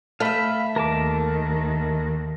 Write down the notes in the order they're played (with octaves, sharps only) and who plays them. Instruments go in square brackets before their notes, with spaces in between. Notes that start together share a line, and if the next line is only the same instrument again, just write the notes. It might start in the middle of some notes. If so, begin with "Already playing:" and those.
[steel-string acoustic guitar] A3 E5 [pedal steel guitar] F5 B5
[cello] D#2 D#3 [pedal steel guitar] A#4 A5 D6